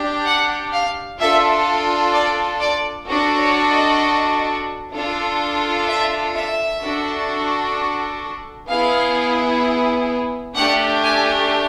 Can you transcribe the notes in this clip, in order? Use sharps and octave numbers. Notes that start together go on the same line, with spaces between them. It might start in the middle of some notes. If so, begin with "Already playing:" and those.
Already playing: D4 G4
F#5
F5
D4 F4 A4 E5
D5
D5
D4 F#4 A4
C#5
D#5
D4 F4 A4
E5
E5
D4 F#4 A4
B3 E4 G#4 F5
A3 D4 G4 F#5
G#5